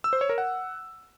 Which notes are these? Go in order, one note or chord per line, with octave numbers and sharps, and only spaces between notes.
E6
C5
C#5
A#4
F#5